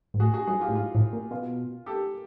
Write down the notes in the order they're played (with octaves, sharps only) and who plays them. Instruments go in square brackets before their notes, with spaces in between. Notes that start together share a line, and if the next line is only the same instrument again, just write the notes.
[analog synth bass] G#2
[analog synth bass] A2 [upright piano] F#4 G#4
[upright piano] F#4 G#4
[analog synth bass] G2 [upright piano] F#4 G#4
[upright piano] F4 G4
[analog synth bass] A2
[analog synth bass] G#2 [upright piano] F4
[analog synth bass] A2
A#2
[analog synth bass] B2 [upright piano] F4
[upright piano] G4 A4